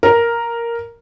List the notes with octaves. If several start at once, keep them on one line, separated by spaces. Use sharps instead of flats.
A#4